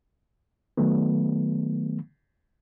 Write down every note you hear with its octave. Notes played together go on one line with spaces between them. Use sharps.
D#3 F#3 A3 B3